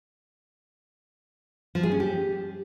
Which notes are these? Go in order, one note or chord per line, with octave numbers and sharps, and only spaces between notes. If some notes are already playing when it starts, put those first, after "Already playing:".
F3
G#4
C#4
G4